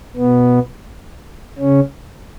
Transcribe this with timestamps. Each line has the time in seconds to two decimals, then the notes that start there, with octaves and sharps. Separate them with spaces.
0.16 B2 B3
1.59 C#3 C#4